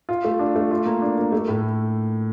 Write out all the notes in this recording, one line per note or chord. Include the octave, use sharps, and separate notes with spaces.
F4
A3
D4
A3
F4
A#3
D4
A#3
A3
A2